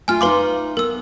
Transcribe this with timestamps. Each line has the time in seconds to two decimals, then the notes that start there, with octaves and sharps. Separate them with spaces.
0.08 A3 F4 G#5 F6
0.21 D#4 B4 E5 F5 C6 D6
0.77 B3 A#4 E6